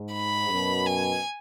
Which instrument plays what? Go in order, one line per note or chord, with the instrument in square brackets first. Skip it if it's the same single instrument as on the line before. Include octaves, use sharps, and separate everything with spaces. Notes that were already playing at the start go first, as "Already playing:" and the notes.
Already playing: [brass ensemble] G#2
[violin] B5
[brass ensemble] F#2 B2
[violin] G#5